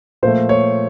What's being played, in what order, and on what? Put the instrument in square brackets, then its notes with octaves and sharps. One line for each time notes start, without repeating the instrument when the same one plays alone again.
[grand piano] A#2 F3 A3 C5
C#5